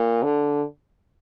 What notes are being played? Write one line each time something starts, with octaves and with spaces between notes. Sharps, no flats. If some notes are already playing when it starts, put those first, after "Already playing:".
Already playing: A#2
D3